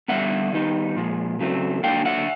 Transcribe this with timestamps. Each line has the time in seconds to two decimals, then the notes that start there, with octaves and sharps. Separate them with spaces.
0.08 D3 G3 B3 E5 F#5
0.52 D#3 G3 B3 D#4
0.96 A#2 F3 G#3
1.39 C#3 F#3 A3 C4
1.83 D3 F#3 A#3 D4 F5 G5
2.05 E5 F#5